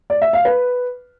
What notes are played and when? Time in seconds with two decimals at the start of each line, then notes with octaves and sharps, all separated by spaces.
0.10 D5
0.22 E5
0.33 F5
0.45 B4